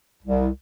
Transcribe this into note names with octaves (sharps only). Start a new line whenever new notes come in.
C2